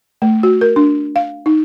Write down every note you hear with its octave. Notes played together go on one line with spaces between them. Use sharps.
A3
F#4
A#4
D4
F5
D#4